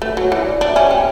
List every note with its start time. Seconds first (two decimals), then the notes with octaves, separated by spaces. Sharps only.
0.02 A3 B4
0.17 F#3
0.25 C#5
0.32 E3
0.46 D5
0.61 D4
0.69 E5
0.76 C#4
0.90 C#4 G5